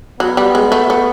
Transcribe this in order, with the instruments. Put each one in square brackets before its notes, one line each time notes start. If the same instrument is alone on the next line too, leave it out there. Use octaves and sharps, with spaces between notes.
[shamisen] F#3 [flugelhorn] B3
[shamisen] G3
G#3
A3
A3